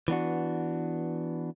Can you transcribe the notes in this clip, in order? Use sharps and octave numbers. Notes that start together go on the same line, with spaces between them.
E3 B3 D4 F#4